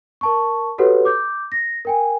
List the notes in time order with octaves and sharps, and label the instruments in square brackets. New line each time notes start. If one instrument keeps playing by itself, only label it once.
[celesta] A#4 A5 C#6
F#4 G4 A4 B4 C#5 F#5
D6 G6
A#6
A#4 G5 G#5